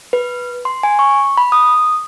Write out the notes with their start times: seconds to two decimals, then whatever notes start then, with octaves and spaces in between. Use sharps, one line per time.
0.13 B4
0.65 C6
0.83 G#5
0.99 C#6
1.37 B5
1.52 D#6